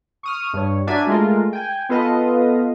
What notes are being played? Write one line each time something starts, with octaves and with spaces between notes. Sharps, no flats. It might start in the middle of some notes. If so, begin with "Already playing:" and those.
C#6 D#6 F6
G2 C#5
D4 F#4 A#4 D5 E5 G#5
G#3 A3 F4 A#4
G5 G#5
B3 F4 A4 B4 D#5 F5